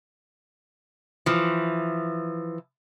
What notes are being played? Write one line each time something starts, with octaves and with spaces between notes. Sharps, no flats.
E3 F3